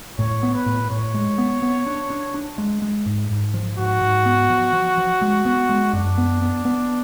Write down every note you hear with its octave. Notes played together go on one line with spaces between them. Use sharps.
A2 C#5
B3
B4
A2
A2 C#5
G#3
B3
B3
D4
D4
D4
G#3
G#3
G#2
G#2
F3
G#2 F#4
G#2
B3
F3
F3
F3
G#3
B3
G#3
F#2 D4
B3
B3
B3